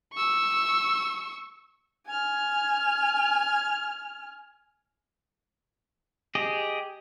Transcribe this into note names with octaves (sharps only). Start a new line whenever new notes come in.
C#6 E6
G#5 F6
G4 G#4 D#5